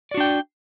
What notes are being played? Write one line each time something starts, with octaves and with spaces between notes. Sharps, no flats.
D4 F#4 D5 G5